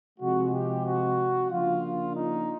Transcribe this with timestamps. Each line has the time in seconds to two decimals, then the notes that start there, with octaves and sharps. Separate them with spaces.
0.19 C3 F3 G#3 F#4
0.52 G4
0.85 F#4
1.50 C#3 F3 A#3 D4 F4
2.15 D#4